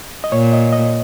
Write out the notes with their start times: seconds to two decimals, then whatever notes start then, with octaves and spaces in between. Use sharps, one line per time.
0.24 D#5
0.32 A#2 C#5
0.53 D#5
0.73 D#5